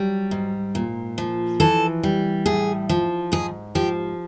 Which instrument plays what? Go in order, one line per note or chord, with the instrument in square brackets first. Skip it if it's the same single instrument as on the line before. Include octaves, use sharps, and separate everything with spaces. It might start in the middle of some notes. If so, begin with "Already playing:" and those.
Already playing: [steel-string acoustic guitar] F#3 G3
G#2
A#2
F3
E3 A4
G3
A2 G#4
F3
G#2 G#4
F3 G4